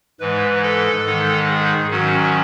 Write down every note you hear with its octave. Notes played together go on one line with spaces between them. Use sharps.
G#2 E3 G#3 B4
A4
G#2 D#3 G#3 D#4
G#4
G#2 D#3 F#3 C#4 F#4